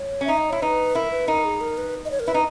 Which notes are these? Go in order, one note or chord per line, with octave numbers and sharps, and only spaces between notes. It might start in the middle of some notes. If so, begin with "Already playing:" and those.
Already playing: C#5
C#4
D#4 E5
D#5
E4 C#5
D#4 B4
E4 A#4
B4
D#4 A#4
G#4
A#4
B4
D#5
C#5
A#4
E4 B4
D#4